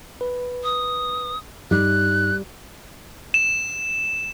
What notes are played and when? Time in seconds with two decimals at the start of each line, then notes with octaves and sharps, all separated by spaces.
0.21 B4
0.64 D#6
1.71 G2 G3 D#4 F#6
3.34 E7